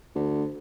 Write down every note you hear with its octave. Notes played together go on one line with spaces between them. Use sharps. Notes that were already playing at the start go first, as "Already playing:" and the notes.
D2